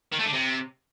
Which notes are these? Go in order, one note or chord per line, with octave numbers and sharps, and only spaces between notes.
D#3
A3
D3
C3